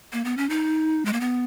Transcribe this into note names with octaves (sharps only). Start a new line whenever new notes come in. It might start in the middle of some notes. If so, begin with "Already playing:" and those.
A#3
B3
C#4
D#4
G#3
A#3
B3